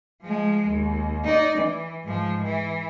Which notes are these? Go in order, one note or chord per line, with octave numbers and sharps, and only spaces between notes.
F3 G#3
D#2
D#4 D5
E3
G#2 F3
E3